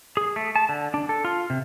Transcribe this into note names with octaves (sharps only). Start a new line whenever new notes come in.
G#4
A3
A5
D3
D4
A4
F4
C3